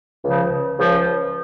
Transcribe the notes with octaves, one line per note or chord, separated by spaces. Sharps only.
C#2 C#3 F3
C#2 C#3 F3